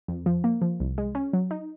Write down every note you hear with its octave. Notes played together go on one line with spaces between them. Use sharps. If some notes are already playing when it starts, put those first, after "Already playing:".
F2
F3
A#3
F3
C2
G#3
C#4
F#3
D#4